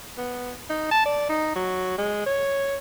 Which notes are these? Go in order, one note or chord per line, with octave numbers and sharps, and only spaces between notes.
B3
D#4
A5
D5
D#4
F#3
G#3
C#5